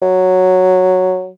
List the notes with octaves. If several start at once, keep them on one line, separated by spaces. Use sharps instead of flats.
F#3